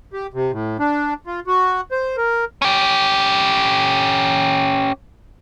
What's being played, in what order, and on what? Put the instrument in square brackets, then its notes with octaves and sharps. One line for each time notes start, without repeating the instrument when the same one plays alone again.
[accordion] G4
C3
A2
D4
F4
F#4
C5
A#4
[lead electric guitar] C#4 G4